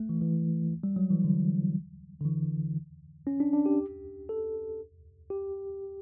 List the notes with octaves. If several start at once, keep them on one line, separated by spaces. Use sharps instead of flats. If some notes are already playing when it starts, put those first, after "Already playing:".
Already playing: A3
E3
E3
G3
F#3
E3
D3
D3
E3
C#4
D4
D4
G4
A4
G4